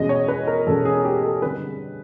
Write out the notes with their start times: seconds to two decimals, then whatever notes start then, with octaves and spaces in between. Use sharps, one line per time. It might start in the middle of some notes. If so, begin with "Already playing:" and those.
Already playing: E2 B2 G#3 C#4 D#5
0.09 C#5
0.28 B4
0.47 A#4
0.67 E2 B2 G#3 C#4 A4
0.85 G#4
0.97 G#4
1.05 G4
1.24 A4
1.42 D3 G3 C4 B4